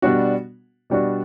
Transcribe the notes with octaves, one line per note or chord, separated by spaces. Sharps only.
B2 G3 B3 D4 F#4
B2 G3 B3 D4 F#4